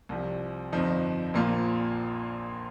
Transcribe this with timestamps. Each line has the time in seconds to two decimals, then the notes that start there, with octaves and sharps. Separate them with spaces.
0.09 C2 C3 F3
0.72 G1 F2 F3 D#4
1.34 A#1 A#2 F3 A#3 F4